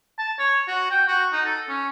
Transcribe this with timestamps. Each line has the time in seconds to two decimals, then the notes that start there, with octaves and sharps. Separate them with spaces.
0.18 A5
0.39 C#5
0.68 F#4
0.91 G5
1.07 F#4
1.32 D#4
1.45 A4
1.69 C#4